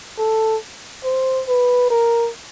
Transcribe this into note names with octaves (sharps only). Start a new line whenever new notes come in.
A4
C5
B4
A#4